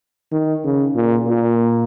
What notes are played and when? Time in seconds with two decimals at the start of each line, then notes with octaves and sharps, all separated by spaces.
0.32 D#3
0.64 C#3
0.95 A#2
1.27 A#2